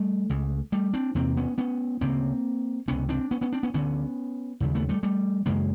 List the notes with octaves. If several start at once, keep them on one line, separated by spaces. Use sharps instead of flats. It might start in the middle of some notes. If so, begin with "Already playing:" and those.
Already playing: G3 A3
C#2 C#3
G3 A3
C4 D4
E2 C3 A#3 C4
B3 C#4
B3 C#4
D2 C#3 A#3 C4
C#2 C3 B3 C#4
C4 D4
B3 C#4
B3 C#4
C4 D4
B3 C#4
D2 D3 B3 C#4
D#2 C#3
A3 B3
G3 A3
G3 A3
F#2 C#3 G#3 A#3